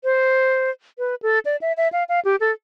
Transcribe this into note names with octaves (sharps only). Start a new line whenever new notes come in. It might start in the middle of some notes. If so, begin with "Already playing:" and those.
C5
B4
A4
D5
E5
E5
F5
F5
G4
A4